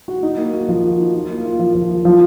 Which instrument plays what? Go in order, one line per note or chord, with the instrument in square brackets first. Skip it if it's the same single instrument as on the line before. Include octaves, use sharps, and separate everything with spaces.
[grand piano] F#4
D#4
A#3
F#4
F3
F#4
D#4
F4
A#3
F4
F3
F3
F4
F3